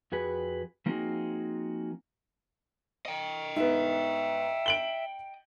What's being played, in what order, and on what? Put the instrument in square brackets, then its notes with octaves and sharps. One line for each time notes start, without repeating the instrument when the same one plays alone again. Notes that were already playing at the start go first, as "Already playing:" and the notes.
[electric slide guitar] F2 F#4 G#4 B4
F3 A#3 C4 D#4 F#4 G#4
[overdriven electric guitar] D#5 G5
[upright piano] G#2 B3 [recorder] E5
[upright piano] D7 F#7 G7